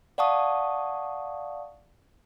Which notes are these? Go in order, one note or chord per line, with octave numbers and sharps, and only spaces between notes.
D5 F5 F#5 A5 C#6 D#6